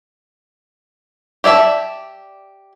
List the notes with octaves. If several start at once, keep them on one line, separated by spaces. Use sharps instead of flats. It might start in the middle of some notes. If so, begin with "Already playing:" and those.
G4 D5 E5 A5